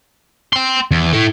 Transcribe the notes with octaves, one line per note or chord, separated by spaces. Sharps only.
G5 C6
E2
E4 A4